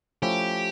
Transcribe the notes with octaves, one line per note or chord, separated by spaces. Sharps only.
F3 A3 C#4 E4 G4